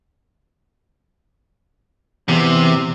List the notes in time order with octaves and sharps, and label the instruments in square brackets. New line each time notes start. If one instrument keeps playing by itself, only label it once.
[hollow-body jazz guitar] E2 [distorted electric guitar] C3